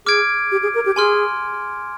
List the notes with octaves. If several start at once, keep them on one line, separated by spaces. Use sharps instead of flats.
G#4 D6 F6 G#6 D7
G4
G#4
A#4
G4
G#4 G#5 C6 F6